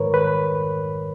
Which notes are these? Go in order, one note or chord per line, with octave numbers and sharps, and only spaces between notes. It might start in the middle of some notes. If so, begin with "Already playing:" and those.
Already playing: G#2 D#3 A#4 B4 C#5
B4